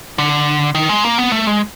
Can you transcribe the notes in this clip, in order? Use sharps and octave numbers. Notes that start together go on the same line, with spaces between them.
D3
D#3
G#3
A#3
B3
A3
G#3